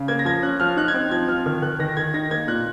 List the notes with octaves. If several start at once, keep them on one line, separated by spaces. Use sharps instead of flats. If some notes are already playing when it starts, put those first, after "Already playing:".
Already playing: C#3
A#3 G#6
A#6
F3 G#6
C#4 F#6
F3 F6
D#4 F#6
G#6
C4
F3 G#6
F3 F6
D#3 F6
D#3 F#6
D#3 A#6
D#3 G#6
D#4 A#6
A#3 G#6
A#2 F#6